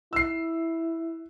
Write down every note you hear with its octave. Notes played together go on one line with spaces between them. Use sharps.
E4 E6 C7